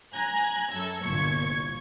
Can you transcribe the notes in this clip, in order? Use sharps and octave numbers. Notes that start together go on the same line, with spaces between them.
G#5 A#5 F#6 G#6
F#2 A4 E6 G#6
G1 C2 A#2 C#6 G#6 C#7